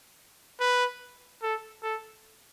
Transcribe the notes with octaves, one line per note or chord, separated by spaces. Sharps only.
B4
A4
A4